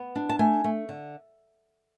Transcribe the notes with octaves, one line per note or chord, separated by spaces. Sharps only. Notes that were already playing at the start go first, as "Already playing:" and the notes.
Already playing: B3
D4
A5
A3 G#5
A3
D3